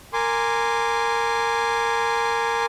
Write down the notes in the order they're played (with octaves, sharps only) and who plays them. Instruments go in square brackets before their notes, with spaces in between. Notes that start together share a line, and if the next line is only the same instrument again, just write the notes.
[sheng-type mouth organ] A#4 G#5 C6 D6